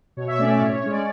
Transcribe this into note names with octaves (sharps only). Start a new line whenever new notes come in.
B2 C#5
E5
A3 C#4 D5
D5
A2 C#5
C#5
G#3 C#4
D5